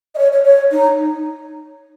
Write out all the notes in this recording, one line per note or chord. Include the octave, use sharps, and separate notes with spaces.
D#5
C#5
C#5
C#5
D#4